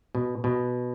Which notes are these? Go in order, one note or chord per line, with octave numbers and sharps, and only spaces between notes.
B2
B2